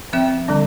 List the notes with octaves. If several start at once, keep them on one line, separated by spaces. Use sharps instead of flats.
F3 C4 E5 G5
D3 G3 D4